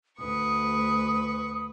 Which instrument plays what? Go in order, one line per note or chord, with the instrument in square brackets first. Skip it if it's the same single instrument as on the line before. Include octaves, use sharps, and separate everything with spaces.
[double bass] D2 [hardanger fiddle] B4 C#6 [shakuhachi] D#6